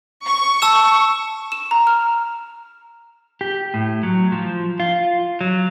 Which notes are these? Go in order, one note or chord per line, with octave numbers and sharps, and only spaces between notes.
C#6
A5 E6 E7
E7
A#5
F6
G4
A2
F#3
F3
F4
F#3